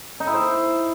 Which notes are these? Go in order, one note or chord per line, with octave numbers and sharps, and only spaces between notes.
D#4
E4
C5